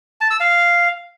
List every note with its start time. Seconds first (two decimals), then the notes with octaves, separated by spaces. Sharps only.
0.21 A5
0.31 E6
0.40 F5